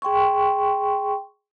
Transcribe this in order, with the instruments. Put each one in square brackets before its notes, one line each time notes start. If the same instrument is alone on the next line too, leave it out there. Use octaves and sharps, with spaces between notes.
[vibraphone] G#4 G5 C6 C#6